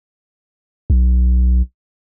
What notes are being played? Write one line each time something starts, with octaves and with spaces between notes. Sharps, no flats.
B1